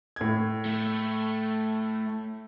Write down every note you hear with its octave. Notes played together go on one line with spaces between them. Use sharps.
A2 G#6
A3